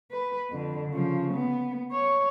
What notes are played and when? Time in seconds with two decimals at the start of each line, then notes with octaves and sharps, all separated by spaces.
0.12 B4
0.50 F2 D3
0.90 C#3 F3
1.33 B3
1.92 C#5